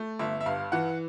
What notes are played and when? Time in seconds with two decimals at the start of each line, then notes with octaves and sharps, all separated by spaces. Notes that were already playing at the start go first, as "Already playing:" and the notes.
Already playing: A3
0.19 G1 E5
0.41 E5
0.46 G2 F5
0.72 E3 F#5